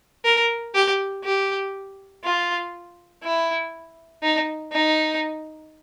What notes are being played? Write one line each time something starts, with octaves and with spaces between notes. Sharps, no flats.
A#4
G4
G4
F4
E4
D#4
D#4